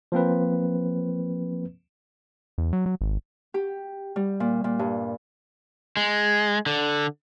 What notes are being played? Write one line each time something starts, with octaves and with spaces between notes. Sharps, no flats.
F3 A#3 C4 B4
E2
F#3
F#3
G#1
G4
G3
A#2
A#2
G2
G#3
D3